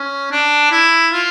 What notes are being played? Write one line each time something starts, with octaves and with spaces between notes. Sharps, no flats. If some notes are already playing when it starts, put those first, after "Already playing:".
Already playing: C#4
D4
E4
F4